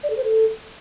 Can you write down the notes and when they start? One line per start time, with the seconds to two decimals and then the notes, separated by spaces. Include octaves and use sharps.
0.03 D5
0.10 A4
0.17 C5
0.24 A4